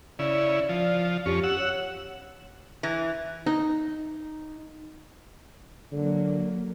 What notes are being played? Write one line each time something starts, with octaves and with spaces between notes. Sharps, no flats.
C#3 E4 D5
F3
F2 C#4 G4
F#5 E6
C#5
E3
D#4
D3 F#3 A#3